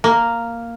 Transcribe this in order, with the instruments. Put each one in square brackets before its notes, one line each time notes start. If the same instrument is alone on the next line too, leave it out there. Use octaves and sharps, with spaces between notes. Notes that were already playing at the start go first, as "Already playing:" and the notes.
[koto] A#3